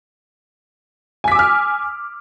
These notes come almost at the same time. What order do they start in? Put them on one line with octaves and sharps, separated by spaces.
G#5 B6 D6 E6 F6